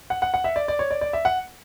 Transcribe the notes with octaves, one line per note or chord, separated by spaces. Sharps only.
F#5
F#5
F#5
E5
D5
D5
C#5
D5
D5
E5
F#5